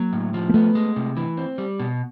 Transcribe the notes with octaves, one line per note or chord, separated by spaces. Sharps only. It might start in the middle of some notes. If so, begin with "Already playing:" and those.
Already playing: F#3 A#3
A2
F3
A#3
A3 B3
G#3
C3
E3
C4
G3
B2